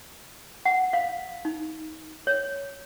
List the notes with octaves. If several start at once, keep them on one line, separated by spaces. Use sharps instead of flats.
F#5
F5
D#4
C#5